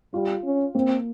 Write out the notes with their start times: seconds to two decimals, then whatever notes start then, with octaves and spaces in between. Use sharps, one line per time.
0.14 G3 F4
0.44 C#4
0.74 A#3 C4